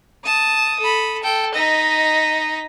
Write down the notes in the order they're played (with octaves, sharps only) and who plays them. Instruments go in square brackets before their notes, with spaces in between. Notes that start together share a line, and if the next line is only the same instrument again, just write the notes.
[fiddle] A5 [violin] D#6
[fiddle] A4 B5
[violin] A4 [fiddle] G5
[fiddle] D#4 D#5 [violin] A#6 B6